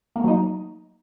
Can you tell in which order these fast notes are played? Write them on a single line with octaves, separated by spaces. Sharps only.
A#3 A3 F#3 D#4